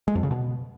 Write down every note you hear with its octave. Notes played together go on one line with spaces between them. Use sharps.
G#3
F2
C#3
B2